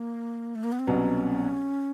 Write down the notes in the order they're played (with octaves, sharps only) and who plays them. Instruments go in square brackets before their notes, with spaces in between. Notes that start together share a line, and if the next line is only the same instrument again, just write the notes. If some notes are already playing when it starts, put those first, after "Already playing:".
Already playing: [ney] A#3
A3
A#3
B3
C4
[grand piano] C2 B2 F#3 B3 [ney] C#4